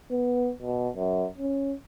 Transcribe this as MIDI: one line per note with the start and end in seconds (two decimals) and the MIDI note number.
0.11 0.51 59
0.62 0.89 47
0.96 1.27 42
1.38 1.74 61